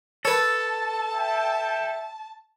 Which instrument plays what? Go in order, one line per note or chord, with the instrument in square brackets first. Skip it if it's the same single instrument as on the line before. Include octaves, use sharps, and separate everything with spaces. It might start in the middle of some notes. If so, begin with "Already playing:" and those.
[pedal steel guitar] A4 [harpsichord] B4 C#5 [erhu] A5
[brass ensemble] E5 G5